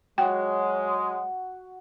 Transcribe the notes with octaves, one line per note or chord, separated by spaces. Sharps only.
F#3 G#3 F#4 G5